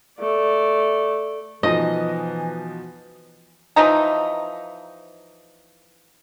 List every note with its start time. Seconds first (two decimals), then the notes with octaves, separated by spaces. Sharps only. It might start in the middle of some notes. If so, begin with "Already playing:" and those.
0.19 A3 D5
1.63 B2 E3 F3 D#4 D#5
3.76 E3 F3 D#4 A#5